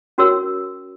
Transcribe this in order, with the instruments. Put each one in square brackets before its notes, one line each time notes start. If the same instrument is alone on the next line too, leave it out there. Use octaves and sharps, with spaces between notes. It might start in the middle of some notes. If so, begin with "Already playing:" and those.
[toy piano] C#4 F#4 A#4 C#5 E6